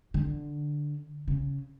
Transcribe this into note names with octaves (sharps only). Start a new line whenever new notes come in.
D3
C#3